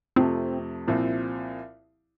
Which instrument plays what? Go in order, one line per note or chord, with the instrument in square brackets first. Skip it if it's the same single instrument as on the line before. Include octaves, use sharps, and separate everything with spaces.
[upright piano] F2 C3 F3 A3 [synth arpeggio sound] C4
[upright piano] C2 A#2 F3 C4 E4